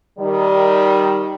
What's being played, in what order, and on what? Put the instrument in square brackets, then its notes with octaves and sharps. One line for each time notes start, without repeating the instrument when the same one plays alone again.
[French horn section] D#3 G3